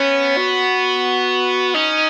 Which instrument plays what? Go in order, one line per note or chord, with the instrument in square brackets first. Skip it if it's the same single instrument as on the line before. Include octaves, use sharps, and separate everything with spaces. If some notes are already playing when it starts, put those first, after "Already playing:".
Already playing: [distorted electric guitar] B3 [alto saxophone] C#4
[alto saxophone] F#4
[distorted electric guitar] C#4 [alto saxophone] D#4